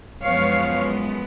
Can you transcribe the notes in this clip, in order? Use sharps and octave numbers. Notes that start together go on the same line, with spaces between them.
F#2 F3 G#3 B3 C#5 F5